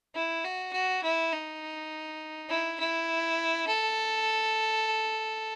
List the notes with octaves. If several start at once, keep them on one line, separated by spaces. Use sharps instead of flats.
E4
F#4
F#4
E4
D#4
E4
E4
A4